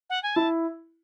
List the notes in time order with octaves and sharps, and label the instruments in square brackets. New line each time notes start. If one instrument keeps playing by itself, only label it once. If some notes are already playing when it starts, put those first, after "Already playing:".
[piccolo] F#5
G#5
[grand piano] E4 [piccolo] A5